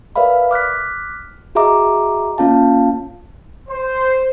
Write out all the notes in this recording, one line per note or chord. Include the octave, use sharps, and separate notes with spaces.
A#4 B4 D5 E5 F5 B5
D6 F6 F#6 B6
F#4 G#4 D#5 E5 A#5 D6
A#3 C#4 F4 F5 A5
C5